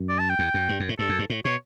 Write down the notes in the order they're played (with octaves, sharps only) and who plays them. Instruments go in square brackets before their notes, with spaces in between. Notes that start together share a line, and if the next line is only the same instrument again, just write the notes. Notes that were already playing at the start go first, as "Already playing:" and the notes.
Already playing: [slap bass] F#2
[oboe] D5
A5
G5
[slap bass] E2
F#2
G2
F#2
A2
[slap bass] G2 [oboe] A4
[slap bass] F#2
G2
A2
[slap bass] B2 [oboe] C#5